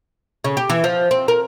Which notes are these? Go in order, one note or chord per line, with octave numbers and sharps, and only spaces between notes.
C#3
G4
E3
F3
C4
A#4